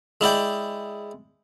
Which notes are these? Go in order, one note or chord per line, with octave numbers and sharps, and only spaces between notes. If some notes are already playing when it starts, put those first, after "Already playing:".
G#3 E4 D5 G5